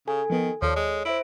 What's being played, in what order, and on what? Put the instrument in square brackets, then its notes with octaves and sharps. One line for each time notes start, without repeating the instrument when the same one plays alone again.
[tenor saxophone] C#3 [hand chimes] A4 G#5
[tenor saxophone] D#3 [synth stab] F3 B3
[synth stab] D#2 A4 D5 [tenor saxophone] F3 [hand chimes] C#5
[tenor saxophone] G#3
[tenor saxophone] E4 [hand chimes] C5 E5 D7